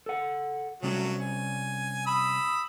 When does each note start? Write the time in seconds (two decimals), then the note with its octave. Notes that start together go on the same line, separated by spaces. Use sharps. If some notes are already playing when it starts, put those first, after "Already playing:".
0.06 A4 F#5
0.83 C3 F#3 G3 A3 C#4
1.21 G#5
2.06 B5 D#6 E6